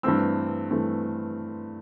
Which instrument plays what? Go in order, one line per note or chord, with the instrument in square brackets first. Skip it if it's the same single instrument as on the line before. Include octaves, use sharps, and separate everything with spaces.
[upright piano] G2 E3 A3 C4 E6
G2 E3 A3 C4